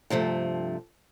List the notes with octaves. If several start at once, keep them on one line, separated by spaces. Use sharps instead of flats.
G2 C3 F3 A3